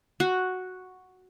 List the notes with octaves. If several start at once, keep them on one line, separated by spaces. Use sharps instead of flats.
F#4